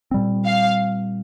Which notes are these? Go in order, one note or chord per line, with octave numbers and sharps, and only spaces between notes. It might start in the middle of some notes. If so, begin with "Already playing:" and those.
A#2 G3 C4
F5